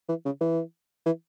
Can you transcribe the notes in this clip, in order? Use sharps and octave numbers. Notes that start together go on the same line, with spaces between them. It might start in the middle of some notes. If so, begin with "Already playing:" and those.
E3
C#3
E3
E3